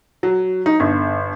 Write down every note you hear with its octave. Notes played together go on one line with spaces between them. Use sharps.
F#3
D#4
G1